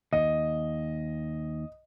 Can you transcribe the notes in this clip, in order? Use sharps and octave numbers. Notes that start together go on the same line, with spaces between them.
D#2 D#5